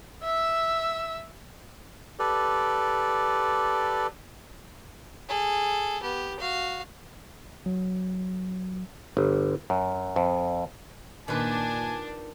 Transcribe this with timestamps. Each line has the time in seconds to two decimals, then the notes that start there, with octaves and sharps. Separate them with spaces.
0.23 E5 E6
2.19 G4 A4 B4 D5
5.28 G#4 A4
6.02 B3 G4
6.39 F#4 F5
7.66 F#3
9.17 G1
9.70 F#2
10.16 F2
11.28 A#2 D#3 D4 B4 G#5